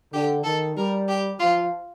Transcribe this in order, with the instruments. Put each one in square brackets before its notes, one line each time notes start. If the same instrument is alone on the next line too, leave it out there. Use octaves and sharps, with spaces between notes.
[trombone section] D3 [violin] G4
[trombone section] D#3 [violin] A4
[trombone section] G3 [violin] A#4
[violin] G4
[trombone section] F3 [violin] F4